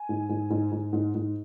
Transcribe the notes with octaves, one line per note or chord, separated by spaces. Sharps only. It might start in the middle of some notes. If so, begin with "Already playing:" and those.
Already playing: G#5
G#2
G#2
G#2
G#2
G#2
G#2